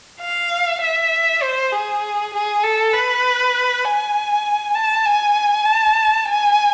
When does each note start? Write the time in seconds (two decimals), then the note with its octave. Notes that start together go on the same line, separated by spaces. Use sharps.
0.21 F5
0.82 E5
1.42 C5
1.73 G#4
2.34 G#4
2.64 A4
2.93 B4
3.84 G#5
4.75 A5
5.06 G#5
5.65 A5
6.26 G#5